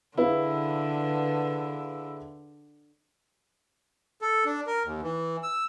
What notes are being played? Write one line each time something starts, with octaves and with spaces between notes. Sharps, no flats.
D3 E4 G#4 B4 F5
A4
D4
A#4
D#2
E3
E6